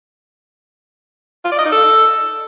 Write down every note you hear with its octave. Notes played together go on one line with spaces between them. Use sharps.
F4
D5
D#5
D#4
A4